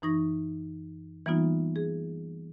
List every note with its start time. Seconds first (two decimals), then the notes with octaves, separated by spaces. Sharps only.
0.02 F#2 E3 D#4 C#6 A#6
1.26 E3 G3 A#3 B3 D#4 F4
1.76 G#4